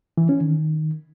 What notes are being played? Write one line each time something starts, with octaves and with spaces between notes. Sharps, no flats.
E3
C#4
D#3